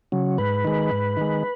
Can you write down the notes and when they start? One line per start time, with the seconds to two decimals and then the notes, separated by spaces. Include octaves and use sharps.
0.12 C#3 F#3
0.38 G#2 B4
0.64 D#3 G#3
0.92 G#2
1.17 D#3 G#3